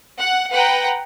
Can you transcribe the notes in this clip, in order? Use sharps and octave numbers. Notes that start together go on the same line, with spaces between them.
F#5
B4 F#5 G5 A#5